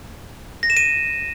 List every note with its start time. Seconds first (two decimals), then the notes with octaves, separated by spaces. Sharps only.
0.63 A#6
0.70 E7
0.77 D#7